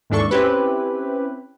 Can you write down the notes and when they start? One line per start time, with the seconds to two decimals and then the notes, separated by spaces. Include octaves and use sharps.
0.10 D#2 G#2 E3 D4 A4 C#6
0.31 C4 C#4 E4 G4 B4